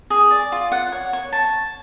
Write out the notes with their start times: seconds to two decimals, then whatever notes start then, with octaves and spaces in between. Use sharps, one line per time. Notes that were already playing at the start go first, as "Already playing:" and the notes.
0.10 G#4
0.31 D5
0.52 F4
0.72 F#5
0.92 C#5
1.13 C#5
1.32 A5